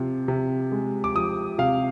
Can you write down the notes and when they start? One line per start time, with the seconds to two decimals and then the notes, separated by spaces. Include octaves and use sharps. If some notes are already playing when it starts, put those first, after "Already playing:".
Already playing: C3 F3
0.28 C3
0.72 G#3
1.04 D6
1.15 F3 D#6
1.58 C3 F5